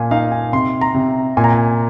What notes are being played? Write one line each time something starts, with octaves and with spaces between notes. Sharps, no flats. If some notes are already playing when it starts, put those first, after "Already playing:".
Already playing: A#2 F5 G#5
D#4 F5
G#5
C3 C6
A#5
C3
A#2 G#5
A#5
G#5